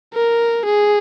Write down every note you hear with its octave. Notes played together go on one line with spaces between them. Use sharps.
A#4
G#4